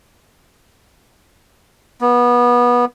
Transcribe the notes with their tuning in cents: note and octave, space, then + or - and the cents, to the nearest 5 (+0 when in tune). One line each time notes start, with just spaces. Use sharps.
B3 -25